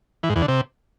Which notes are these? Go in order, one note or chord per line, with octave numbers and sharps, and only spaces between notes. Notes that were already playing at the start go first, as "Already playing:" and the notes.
E3
G#2
E2
D3
C3